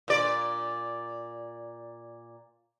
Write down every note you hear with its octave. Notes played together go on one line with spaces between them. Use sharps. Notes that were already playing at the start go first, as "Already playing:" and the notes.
A#2 D5